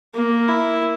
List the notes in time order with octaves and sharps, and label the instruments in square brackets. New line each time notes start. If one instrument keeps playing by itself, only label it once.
[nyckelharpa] A#3
E4